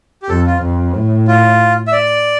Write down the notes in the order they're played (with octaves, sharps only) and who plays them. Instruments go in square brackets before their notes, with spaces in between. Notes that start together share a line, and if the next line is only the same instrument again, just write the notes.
[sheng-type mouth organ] G4
[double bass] F2 [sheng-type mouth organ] A4
[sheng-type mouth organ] F4
[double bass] F2
A2
[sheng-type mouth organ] F4
E5
D5